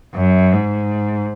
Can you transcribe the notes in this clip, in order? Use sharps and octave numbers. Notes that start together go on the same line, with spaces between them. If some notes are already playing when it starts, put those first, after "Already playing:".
F#2
G#2